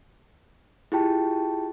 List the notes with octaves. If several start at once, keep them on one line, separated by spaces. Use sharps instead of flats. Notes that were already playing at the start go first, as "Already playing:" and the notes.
E4 F4 G4 G#4 G5 A5